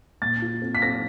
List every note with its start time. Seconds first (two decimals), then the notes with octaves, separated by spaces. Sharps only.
0.22 A#2 A6
0.42 F4
0.62 C4
0.75 B6
0.82 C4 A#6